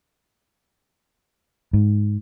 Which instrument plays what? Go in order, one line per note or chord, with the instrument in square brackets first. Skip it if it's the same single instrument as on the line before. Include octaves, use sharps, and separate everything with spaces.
[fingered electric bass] G#2